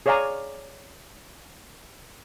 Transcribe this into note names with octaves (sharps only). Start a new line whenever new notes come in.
G#4 C#5 D5 F5 G#5 A#5